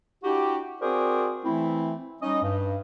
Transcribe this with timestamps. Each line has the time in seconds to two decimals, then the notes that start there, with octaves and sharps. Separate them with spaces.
0.24 D4 E4 F#4 G4
0.81 C4 F#4 G#4 A#4 C5 D5
1.45 E3 A3 C4 E4
2.22 G3 C#4 D#4 D#5
2.43 G2